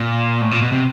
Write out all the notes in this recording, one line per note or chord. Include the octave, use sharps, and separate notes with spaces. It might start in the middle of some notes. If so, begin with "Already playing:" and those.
Already playing: A#2
A2
A#2
B2
C3